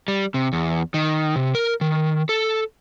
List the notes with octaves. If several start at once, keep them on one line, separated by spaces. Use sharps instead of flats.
G3
C3
E2
D#3
C3
A#4
D#3
A4